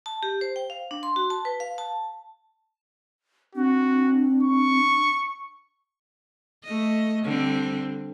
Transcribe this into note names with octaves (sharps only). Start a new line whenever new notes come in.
A5
G4
C5
G5
F5
D4
C6
F#4
A5
B4
F5
A5
C4 D4 F#4
C#6
A3 D#5
D3 G3 C4